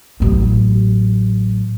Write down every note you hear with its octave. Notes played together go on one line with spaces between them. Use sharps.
A1 F#3